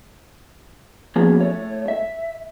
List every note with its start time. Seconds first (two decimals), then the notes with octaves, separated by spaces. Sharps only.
1.16 F3 A#3 B3 C#4 F#4 G#4
1.40 A3 C#5
1.88 E5